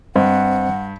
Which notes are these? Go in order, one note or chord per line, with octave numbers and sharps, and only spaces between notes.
G2 C4 C5 D#5 F#5